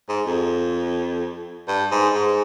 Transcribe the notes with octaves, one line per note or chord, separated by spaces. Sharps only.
G#2
F2
G2
G#2
G#2